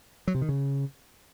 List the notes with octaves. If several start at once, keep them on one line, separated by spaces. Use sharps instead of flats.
F#3
C3
D#3
C#3